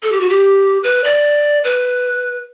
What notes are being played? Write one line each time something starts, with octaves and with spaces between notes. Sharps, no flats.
A4
G4
F#4
G4
B4
D5
B4